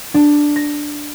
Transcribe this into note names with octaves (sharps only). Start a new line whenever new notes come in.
D4
A#6